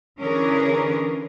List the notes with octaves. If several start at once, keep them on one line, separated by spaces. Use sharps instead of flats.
D3 E3 C#4 D4 G#4 A#4